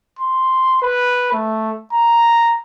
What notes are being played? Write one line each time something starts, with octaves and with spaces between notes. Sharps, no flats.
C6
B4
A3
A#5